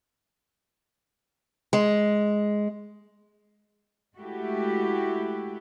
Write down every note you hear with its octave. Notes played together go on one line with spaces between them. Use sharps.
G#3
G#3 A3 E4 F#4 G4